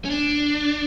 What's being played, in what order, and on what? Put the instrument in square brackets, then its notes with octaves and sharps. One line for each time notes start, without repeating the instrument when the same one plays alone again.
[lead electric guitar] C#4
D4